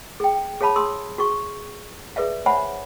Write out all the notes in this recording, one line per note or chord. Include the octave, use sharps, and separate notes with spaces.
G#4 G5
G#4 C#5 F5 A5 B5
G#4 C6 D#6 E6
F#4 G#4 C#6
G#4 B4 D5 E5 F5
C5 C#5 E5 F#5 G#5 B5